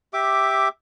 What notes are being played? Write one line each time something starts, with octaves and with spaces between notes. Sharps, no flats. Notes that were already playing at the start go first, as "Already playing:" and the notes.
G4 E5 D6